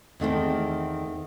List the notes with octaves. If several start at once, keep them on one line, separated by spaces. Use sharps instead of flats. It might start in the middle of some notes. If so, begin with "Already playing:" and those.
E2 D#3 A3 C4